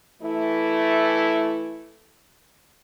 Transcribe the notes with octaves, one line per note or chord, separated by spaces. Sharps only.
E3 A3 E4